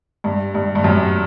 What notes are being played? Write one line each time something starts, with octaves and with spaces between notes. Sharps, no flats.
G2
G2
G2
F#2